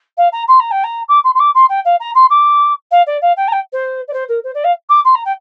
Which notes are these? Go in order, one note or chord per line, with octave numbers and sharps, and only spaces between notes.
F5
A#5
C6
A#5
G5
A#5
D6
C6
C6
D6
C6
G5
F5
A#5
C6
D6
F5
D5
F5
G5
A#5
G5
C5
D5
C5
A#4
C5
D5
F5
D6
C6
A#5
G5